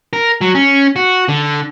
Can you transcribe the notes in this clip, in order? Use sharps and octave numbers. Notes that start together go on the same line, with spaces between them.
A#4
F#3
C#4
F#4
D3